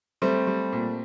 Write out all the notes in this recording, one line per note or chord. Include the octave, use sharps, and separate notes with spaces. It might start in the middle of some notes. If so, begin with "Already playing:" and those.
G3 A3 C4
G3
A#2